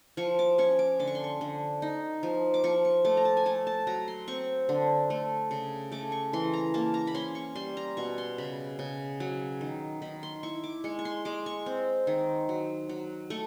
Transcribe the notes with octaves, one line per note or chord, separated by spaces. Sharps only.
F3 C#6
D6
C#4 C#6
D6
D3 D6
C#6
C6
C#6
D3
D#4
F3
D6
F3 C#6
C#6
A3 D6
A#5
A5
G#5
A3 A5
A5
F#3 A#5
C6
C4 C#6
D3
A3
C#3
A3 D6
C#6
E3 C6
A#5
A#3 A5
A#5
B5
C#4 C6
C#6
G3 C6
A#5
B2 C#6
C6
C#3 B5
C#3
F#3
D#3
D#3 B5
C6
E4 C#6
D6
G#3 C#6
C#6
C6
G#3 D6
C#6
C4
D#3
F#3
F#3
A3 C#6